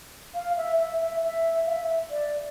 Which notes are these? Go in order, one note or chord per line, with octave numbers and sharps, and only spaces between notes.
F5
E5
E5
E5
E5
F5
E5
D5